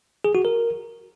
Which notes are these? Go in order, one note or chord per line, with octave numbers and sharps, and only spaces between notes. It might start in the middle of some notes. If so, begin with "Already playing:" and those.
G#4
F#4
A#4